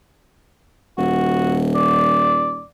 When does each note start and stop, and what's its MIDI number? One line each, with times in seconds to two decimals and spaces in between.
0.98 2.67 27
0.98 1.58 66
1.75 2.64 74